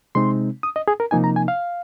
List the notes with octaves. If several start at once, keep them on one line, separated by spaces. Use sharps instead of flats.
C3 G#3 C4 D#4 C6
D#6
D#5
G#4
A#4
C3 F3 A#3 D#4 G#5
A#5
G#5
F5